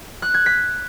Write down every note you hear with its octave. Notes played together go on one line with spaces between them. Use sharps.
F#6
G#6
B6